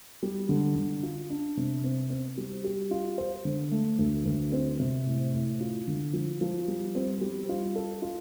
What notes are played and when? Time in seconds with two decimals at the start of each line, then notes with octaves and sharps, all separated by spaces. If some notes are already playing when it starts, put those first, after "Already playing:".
0.23 G3
0.49 D3
0.76 D3
1.03 F4
1.30 D4
1.57 C3
1.84 C4
2.10 C4
2.38 G3
2.64 G4
2.91 F4
3.18 C5
3.45 D3
3.71 A3
3.99 D2
4.26 D2
4.52 C4
4.80 C3
5.07 A2
5.34 A2
5.61 F4
5.88 D3
6.13 F3
6.41 F3
6.68 G3
6.95 C4
7.21 G3
7.49 F4
7.76 A4
8.02 F4